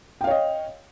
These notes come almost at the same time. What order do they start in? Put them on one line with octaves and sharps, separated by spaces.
G5 F5 C#5 D#5